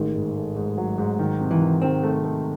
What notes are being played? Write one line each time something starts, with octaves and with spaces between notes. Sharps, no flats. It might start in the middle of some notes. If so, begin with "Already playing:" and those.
Already playing: A1 D#3 G#3
G#2
A3
G#2
F#3
G#2
D#3
C3
E3
D#3
D#3 C4
A3
A3